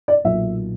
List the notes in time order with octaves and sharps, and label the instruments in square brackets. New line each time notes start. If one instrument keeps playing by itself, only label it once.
[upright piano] D5
B1 A#2 A#3 E5